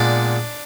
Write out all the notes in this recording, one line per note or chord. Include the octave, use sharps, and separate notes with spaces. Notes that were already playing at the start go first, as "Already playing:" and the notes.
Already playing: A#2 G#3 B3 D4